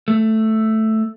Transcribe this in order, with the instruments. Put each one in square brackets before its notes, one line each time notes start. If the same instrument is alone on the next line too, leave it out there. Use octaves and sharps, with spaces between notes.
[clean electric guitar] A3